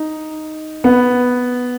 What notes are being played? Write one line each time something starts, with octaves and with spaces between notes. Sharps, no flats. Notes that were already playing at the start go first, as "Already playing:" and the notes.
Already playing: D#4
B3